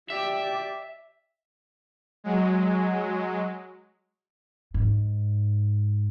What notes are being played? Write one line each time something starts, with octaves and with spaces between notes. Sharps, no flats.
G4 D5 E5
F#3 G#3
G#2